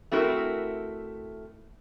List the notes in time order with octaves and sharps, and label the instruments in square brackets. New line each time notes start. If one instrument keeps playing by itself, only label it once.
[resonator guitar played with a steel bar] A3 C4 E4 F#4 A#4